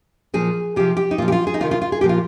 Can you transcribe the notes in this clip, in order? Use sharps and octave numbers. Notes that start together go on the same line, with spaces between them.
A#2 F3 G#4
C3 F3 G4
G4
D#4
A#2 F3 F4
G4
F4
G#4
D#4
C3 D#3 F4
F4
F4
G#4
A#2 F3 G4
F4